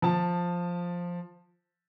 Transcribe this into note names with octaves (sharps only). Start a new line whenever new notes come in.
F3 A5